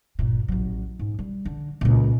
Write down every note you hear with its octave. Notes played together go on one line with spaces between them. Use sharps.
G1 A#2
A1 F#3
G#2
G3
D3
C#2 A#2